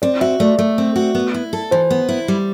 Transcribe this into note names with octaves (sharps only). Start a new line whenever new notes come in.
C4 D5
F#4 E5
A3 D5
A3
C4
F#4
B3
E4
A4
E3 C5
B3
E4
G3